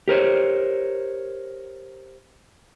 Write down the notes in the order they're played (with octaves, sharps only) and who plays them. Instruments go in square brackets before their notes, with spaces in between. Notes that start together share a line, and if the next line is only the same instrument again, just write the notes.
[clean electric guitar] G4 A#4 C5 C#5